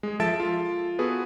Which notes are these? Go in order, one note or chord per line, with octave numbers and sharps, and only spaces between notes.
G#3 G#4
F3 A4 E5 A5 A6 D7
F4
B3 F#4 G#4 A4 B4